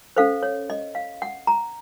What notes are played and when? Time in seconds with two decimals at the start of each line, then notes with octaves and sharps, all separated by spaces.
0.16 C#4 A4 C5 F5
0.43 C#5
0.70 D#5
0.95 F5
1.22 F#5
1.47 A#5